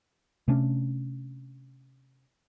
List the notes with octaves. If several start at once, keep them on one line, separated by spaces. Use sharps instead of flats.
C3 A3 C#4 D4